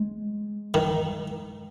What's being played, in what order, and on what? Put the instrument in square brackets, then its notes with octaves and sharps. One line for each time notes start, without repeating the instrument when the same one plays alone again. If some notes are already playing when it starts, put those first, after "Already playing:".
Already playing: [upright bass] G#3
[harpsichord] D#3